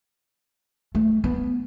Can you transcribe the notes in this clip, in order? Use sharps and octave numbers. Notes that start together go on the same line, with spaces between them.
A3
B3